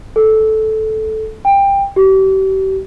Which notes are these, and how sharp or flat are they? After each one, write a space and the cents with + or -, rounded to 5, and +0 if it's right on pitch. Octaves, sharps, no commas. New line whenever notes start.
A4 -10
G5 +20
G4 -35